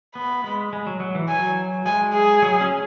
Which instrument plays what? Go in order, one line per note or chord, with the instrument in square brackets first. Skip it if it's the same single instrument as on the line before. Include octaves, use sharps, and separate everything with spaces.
[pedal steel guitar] B3 [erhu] B5
[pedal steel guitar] G#3
G#3
F#3
F#3
E3
[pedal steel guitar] F#3 [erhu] G#5
[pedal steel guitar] G#3 [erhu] G#5
[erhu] G#4
[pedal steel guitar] F#3
C#4